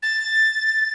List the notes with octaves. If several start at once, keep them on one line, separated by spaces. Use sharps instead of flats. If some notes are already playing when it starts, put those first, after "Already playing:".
A6